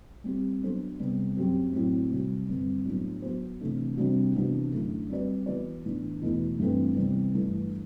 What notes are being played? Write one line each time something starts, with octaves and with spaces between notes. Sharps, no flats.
G3 C4 G4
F#3 B3 D4 A4 C5
C3 G3 B3
F#2 F#3 C4 G4
A2 F#3 C4
C3 G3 C4 F#4
G2 D3 G3 C4
A2 F#3 B3 D4
F#3 B3 F#4 C5
C3 E3 A3 D4
C3 G3 D4 F#4
C3 E3 B3 D4 F#4
F#2 D3 A3 E4
G3 C4 F#4 B4 D5
E3 B3 F#4 B4 D5
A2 E3 B3 D4
E2 B2 A3 E4
G2 E3 A3 C4
C3 E3 G3 B3
G2 E3 A3 D4